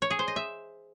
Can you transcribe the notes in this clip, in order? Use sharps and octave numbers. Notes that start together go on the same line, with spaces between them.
C#5
G#4
C5
D#5
E5